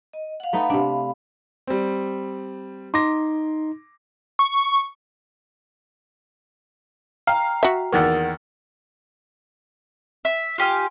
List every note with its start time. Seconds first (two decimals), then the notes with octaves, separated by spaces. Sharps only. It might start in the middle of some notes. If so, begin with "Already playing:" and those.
0.13 D#5
0.40 F5 F#5
0.53 A3 B3 D#4 F5 B5
0.70 C3 D4
1.67 G3 C4
2.94 D#4 C6 D6 A#6
4.39 C#6
7.27 F5 G5 A#5
7.63 F#4 E5
7.92 E2 D#3 A#3 A#4 F#5 A6
10.25 E5
10.58 F4 G4 G#5 F6